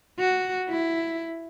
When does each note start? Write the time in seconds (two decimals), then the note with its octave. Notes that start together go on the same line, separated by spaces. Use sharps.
0.19 F#4
0.69 E4